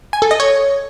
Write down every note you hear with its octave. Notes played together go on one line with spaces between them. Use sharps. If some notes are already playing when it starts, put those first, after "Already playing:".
G#5
A4
D#5
C#5